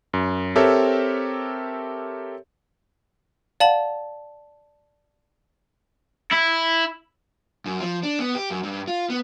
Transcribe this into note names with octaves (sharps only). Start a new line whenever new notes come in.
F#2
C4 G4 A4 A#4 C#5 E5
D5 F5 F#5 A5 F#7
E4
F#2
F3
D4
B3
G4
F#2
G2
F4
B3